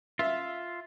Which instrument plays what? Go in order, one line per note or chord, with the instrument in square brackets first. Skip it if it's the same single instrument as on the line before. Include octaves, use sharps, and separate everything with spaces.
[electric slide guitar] F4 [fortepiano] E5